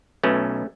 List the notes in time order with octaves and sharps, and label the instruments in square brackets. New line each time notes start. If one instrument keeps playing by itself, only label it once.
[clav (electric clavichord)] B1 B2 A3 C#4